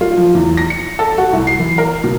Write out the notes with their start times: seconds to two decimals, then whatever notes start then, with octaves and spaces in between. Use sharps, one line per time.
0.01 F4
0.17 F3
0.35 E2
0.57 A#6
0.70 C#7
0.99 A4
1.18 F#4
1.33 C2
1.47 C7
1.59 E3
1.78 A#4
2.04 B2